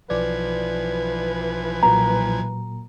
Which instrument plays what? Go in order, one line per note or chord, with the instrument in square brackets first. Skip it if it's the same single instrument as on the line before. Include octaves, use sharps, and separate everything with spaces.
[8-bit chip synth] B1 F3 G#6 [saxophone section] E3 B4 [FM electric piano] D5
[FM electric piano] A#2 F#3 A#3 [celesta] A#5